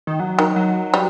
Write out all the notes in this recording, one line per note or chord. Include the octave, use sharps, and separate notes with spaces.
D#3
F#3
D#3
F#3
G3